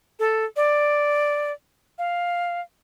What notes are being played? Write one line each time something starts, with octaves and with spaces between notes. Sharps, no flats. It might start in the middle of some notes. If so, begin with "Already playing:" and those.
A4
D5
F5